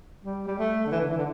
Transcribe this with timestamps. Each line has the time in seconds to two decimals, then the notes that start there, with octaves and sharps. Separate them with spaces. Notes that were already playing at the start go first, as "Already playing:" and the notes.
0.25 G3
0.47 G3
0.58 A3
0.86 D3
0.91 E3
1.01 D3
1.09 E3
1.17 D3